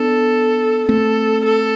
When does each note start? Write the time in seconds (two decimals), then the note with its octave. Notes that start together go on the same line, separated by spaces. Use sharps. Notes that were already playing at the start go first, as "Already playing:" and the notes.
Already playing: B3 D4 A4
0.89 A3 C4 A4
1.45 A4